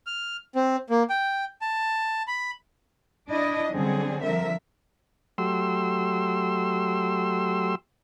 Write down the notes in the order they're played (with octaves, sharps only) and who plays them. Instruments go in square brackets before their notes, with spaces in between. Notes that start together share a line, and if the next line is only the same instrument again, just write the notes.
[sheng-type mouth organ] F6
C4
A#3
G5
A5
B5
[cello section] D4 E4 D5 D#5
D3 F#3 G3 C4 C#4 G#4
D3 F3 A#4 E5
[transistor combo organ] F#3 A3 G4 C6 E6